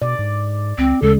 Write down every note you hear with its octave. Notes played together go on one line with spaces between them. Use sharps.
B2 D5
G#2
C#2 C4
D2 C#3 G#3 A4